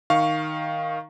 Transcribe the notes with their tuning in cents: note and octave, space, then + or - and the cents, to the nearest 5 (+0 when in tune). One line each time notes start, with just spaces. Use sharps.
D#3 +0 F5 +0 C#6 +0